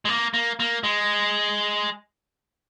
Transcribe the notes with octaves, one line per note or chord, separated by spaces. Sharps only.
G#3
A#3
A#3
A#3
G#3